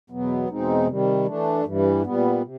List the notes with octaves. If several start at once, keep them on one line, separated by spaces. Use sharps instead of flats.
E2 B2 F#3 B3
E2 B2 G#3 C4 D#4
C3 D#3 G3
E3 A3 D4
G2 E3 G3
A#2 G3 B3
C3